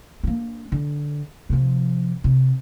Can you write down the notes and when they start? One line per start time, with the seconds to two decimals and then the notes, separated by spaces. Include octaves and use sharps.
0.24 A#3 D4
0.72 D3
1.49 C3 F3
2.24 C3